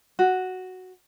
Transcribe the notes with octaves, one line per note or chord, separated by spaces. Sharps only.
F#4